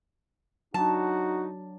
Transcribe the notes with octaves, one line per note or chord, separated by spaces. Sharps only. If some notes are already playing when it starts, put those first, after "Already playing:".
F#3 D4 D#4 F#4 A5